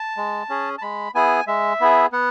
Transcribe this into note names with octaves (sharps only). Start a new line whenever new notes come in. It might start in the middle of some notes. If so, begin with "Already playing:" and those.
Already playing: A5
G#3
C#4 G#4
A5
G#3 B5
B3 E4 G#4 G#5
G#3 E5
B3 E4 G#4
B3 F#5